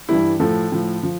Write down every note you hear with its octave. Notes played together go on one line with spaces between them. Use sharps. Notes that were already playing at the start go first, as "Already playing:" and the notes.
G2 E3 G3 E4
A2 F3 A4
A2 F3
F3